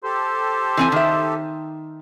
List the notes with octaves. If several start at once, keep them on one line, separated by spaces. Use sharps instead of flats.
G4 A4 C5
E3 C4 G#5
D#3 E5